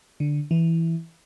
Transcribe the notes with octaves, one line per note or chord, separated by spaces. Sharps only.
D3
E3